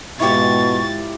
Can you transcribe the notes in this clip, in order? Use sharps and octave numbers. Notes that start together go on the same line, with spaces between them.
G#2 B2 E4 F4 G4 C#6 A6